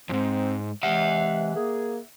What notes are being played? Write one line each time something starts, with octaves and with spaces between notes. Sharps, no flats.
F2 G#2 C4
C3 E3 G#3 E5 F#5
A#3 G#4